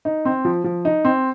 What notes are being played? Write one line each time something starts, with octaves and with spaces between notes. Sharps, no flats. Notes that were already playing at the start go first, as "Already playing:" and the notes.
D#4
C4
F3
F3
D#4
C4